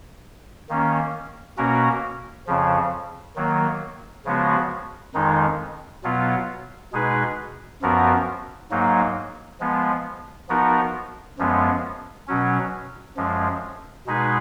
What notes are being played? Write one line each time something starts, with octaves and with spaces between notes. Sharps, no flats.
D#3 A#3 C#4
B2 A#3 C#4 F#4 A#4
F2 C#3 F3
D#3 F#3 A#3
C#3 F3 G#3 B3 F#4
F2 D#3 G#3 D#4
B2 F#3 B3 F4
B2 G#3 D#4 G#4 B4
F#2 F3 B3 F#4 A#4
G#2 F#3 A#3 D#4
F3 G#3 B3
F3 B3 D#4 F#4 A#4
F#2 F3 G#3 B3
B2 F#3 C#4
F#2 F3 G#3
B2 G#3 D#4 G#4 B4